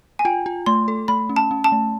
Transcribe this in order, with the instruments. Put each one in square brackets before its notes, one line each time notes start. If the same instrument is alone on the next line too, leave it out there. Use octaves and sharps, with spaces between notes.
[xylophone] G#5
[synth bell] F4 [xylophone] G5
[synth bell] F4
[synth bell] A3 [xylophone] C6
[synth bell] A4
[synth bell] A3 [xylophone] B5
[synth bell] C#4
[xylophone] A5
[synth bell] C#4
[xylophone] A5
[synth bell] A3